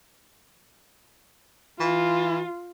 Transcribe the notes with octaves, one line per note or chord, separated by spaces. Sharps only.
E3 F4